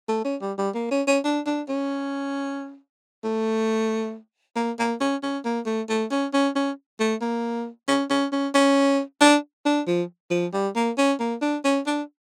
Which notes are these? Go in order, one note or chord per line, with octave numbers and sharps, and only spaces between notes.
A3
C#4
G3
G3
A#3
C#4
C#4
D4
D4
C#4
A3
A#3
A#3
C#4
C#4
A#3
A3
A3
C#4
C#4
C#4
A3
A#3
C#4
C#4
C#4
C#4
D4
D4
F3
F3
G3
A#3
C#4
A#3
D4
C#4
D4